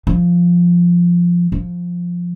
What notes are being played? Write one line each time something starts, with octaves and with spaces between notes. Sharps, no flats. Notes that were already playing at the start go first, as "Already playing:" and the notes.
F3
F3